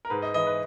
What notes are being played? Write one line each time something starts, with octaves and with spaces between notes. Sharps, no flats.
A#4
G#2 B4
D#5
E3 D#5
B4